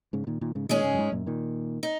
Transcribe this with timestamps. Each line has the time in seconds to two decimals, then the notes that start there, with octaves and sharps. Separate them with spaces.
0.13 G#2 C#3
0.27 A#2 D#3
0.41 A#2 D#3
0.55 G#2 C#3
0.69 A#2 D#3 G#3 C#4 G#4
0.84 G#2 C#3
0.93 F#2
0.99 G#2
1.12 F#2 A#2
1.26 A#2 D#3
1.83 D#4